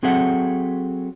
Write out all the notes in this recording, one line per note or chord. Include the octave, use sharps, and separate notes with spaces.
F#3 C4 G#4 A4 E5 F#5